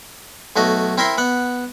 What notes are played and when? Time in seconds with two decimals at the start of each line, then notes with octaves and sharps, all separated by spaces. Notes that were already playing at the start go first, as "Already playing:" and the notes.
0.56 B1 A3 F#4 D#5
0.97 C4 E4 A#4 E5 A#5 C6
1.18 B3 F#5